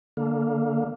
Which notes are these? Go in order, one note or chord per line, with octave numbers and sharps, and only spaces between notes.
D3 A#3